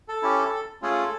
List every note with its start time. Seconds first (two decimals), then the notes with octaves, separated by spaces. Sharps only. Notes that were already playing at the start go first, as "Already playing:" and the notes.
0.08 A4
0.23 C#4 E4 G4
0.82 A3 C#4 F4 G#4 A4